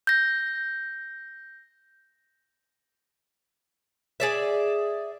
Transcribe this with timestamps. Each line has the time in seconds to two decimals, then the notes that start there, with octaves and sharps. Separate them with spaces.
0.07 G6 A#6
4.20 G#4 D5 E5